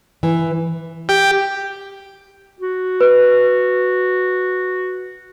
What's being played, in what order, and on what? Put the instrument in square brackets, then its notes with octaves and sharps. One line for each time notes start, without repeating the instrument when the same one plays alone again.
[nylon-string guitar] E3
[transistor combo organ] G4
[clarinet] F#4
[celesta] B4